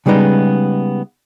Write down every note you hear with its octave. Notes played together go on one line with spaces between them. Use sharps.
C#3 G3 G#3 B3 D#4